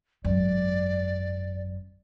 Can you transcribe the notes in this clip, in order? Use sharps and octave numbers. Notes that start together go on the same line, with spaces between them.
G#1 F#2 D5